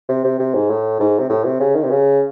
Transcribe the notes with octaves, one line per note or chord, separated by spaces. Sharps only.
C3
C3
C3
G#2
A2
G#2
C3
A2
C3
C#3
D#3
C3
C#3